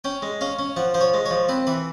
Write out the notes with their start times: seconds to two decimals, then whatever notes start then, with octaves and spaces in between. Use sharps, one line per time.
0.04 C#4 G5
0.22 G#3
0.41 C#4 F5
0.59 C#4
0.77 F3 F#5
0.94 F3 C5
1.01 C#5
1.14 G#3
1.26 C#5
1.31 F3
1.49 C4 B4
1.67 E3 B4